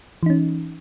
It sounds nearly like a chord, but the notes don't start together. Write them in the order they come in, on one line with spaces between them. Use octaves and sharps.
E3 D#4 C#4